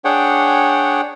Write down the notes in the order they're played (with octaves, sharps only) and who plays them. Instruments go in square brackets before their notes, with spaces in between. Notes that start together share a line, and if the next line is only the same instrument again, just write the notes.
[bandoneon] D4 G#4 C#5 F#5 G5